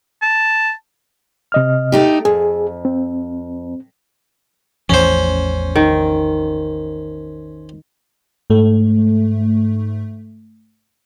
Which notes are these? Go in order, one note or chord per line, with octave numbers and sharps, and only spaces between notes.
A5
C3 D#5 F6
A3 D#4 G4
F2 G#4
C4
A1 E2 F3 C#4 C5
D#3
G#2 A3